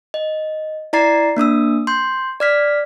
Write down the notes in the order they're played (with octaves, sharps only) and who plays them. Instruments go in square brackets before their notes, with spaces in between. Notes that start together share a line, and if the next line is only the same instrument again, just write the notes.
[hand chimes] D#5
E4 D5 A#5 A6 C7
A#3 D4 D#6 E6
C6 G6
D5 F6 B6